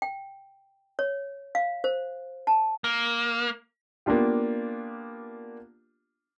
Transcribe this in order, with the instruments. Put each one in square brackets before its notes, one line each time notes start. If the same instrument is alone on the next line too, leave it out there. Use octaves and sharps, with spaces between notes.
[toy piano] G5
C#5
F5
C5
A5
[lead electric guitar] A#3
[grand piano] A#3 B3 D4 F4 G4